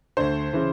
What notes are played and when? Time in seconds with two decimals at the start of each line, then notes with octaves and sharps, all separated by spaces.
0.17 D2 D3 C5
0.53 C#3 E3